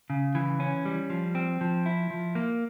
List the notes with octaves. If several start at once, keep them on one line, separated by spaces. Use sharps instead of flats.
C#3
E3
C#4
G3
F3
C4
F3
E4
F3
A#3